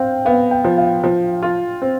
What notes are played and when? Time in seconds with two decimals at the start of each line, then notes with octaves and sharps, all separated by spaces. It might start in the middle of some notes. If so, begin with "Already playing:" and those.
Already playing: C4 F5 G5
0.25 B3 F5
0.51 G5
0.65 F3
0.78 F5
1.04 F3
1.43 F4
1.82 C4